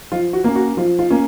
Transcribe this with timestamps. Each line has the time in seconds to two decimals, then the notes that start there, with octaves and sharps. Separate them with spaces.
0.12 F3 F4
0.33 F#4
0.44 A#3 C#4
0.55 F#4
0.77 F3 F4
0.99 F4
1.10 A#3 C#4